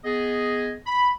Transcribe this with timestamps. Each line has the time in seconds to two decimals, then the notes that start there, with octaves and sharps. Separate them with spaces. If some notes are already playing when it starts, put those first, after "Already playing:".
0.04 B3 G#4 D#5
0.86 B5